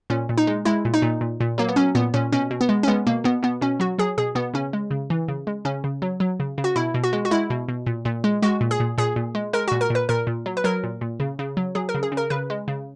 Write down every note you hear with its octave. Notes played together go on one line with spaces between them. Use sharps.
A#2 C#4
A#2
D#4
G#3
G#3 E4
A#2
D#4
A#2
A#2
A#2
F#3 A#3
B3
F#3 C#4
A#2 B3
A#2 C#4
B2 C#4
B2
B3
G#3
C#4
G#3 B3
B2 A#3
B2 B3
B2 B3
B2 C#4
F#3 F#4
F#3 G#4
B2 G#4
B2 B3
C#3 C#4
G#3
C#3
E3
C#3
G#3
C#3 C#4
C#3
F#3
F#3
C#3
C#3
F#4
B2 E4
B2
F#4
G#3
F#4
G#3 E4
B2
B2
A#2
A#2
G#3
G#3 F#4
A#2
G#4
A#2
A#2 G#4
A#2
G#3
G#3 A#4
A#2 F#4
A#4
A#2 B4
A#2 A#4
A#2
F#3
B4
F#3 A#4
A#2
A#2
C#3
C#3
F#3
F#3 G#4
A#4
C#3
G#4
C#3
A#4
C#3 B4
G#3
C#3